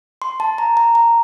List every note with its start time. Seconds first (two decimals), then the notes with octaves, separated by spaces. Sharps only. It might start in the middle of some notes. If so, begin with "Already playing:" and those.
0.22 C6
0.40 A5
0.58 A#5
0.77 A#5
0.95 A#5